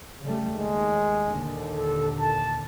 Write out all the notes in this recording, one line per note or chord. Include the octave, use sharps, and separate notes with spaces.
C#3 G3 A3
D#2 G#3
D#2 A#2 D3
A4
A5